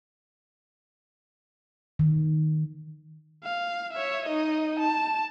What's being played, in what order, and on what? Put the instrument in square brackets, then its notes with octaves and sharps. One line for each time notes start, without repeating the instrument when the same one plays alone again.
[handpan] D#3
[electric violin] F5
C#5 E5
D#4 D#5
A5